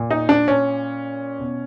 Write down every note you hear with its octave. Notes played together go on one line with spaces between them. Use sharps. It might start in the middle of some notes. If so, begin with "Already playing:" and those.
Already playing: A#2
D#4
D4
C#4
B2